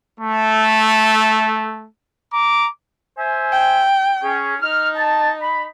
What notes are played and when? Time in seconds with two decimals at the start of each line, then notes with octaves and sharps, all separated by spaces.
0.20 A3
2.33 A#5 D6
3.18 C5 E5 G#5
3.52 G5
4.23 C#4 G#4
4.62 D#4 F6
4.96 A5
5.42 B5